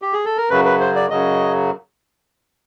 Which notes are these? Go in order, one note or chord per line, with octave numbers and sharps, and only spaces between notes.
G4
G#4
A4
A#4
F#2 C#3 F#3 B4
B4
C5
D5
F#2 C#3 F#3 D#5